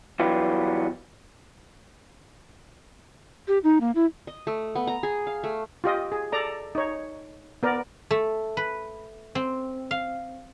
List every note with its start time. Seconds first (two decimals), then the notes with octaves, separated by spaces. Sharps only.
0.20 E3 F#3 G3 B3 F4 G4
3.48 G4
3.64 D#4
3.81 A#3
3.95 E4
4.27 D#5
4.47 A3
4.75 B3
4.87 A#5
5.03 G#4
5.27 F5
5.44 A3
5.84 F4 G4 D#5
6.12 G#4
6.32 A4 D5 A#5
6.75 D#4 C#5
7.63 B3 A#4 D5
8.11 A3
8.57 B4
9.35 C4
9.91 F5